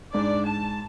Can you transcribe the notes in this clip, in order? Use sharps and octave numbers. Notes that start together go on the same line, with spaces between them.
G#2 D4 D5
A5